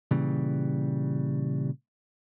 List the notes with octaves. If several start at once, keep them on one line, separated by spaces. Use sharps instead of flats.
A#2 C#3 E3 G3